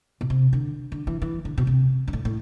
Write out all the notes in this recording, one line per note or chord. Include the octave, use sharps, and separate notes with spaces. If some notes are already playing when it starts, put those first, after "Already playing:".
B2
C3
D3
D3
E3
E3
D3
B2
C3
G2
A2
A2